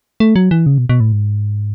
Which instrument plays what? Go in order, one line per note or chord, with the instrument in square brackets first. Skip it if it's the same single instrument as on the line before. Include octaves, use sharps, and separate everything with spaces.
[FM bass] A3
F#3
E3
C#3
B2
B2
A2
G#2